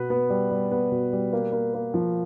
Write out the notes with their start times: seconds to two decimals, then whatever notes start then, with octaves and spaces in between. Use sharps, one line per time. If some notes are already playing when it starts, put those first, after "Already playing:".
Already playing: B2 B3 B4
0.10 B3
0.30 G3
0.51 G3
0.71 B3
0.92 B2
1.13 G3
1.33 A#3
1.53 A#3
1.74 A#3
1.94 F3